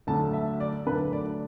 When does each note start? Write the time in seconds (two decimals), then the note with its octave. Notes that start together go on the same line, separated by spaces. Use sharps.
0.07 D2 D3 F#3 A3 D4 A5
0.33 E5
0.60 D5
0.86 D2 D3 F#3 A3 D4 B4
1.13 D5